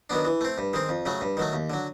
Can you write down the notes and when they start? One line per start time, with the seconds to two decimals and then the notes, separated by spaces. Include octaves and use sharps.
0.10 D#3 F#3 B3 D4
0.25 E3
0.41 A3 C4
0.58 G2
0.73 D#3 G#3 C4
0.89 F2
1.06 C#3 F#3 A3
1.21 G2
1.37 D#3 F#3 A3
1.53 D#2
1.70 D3 F#3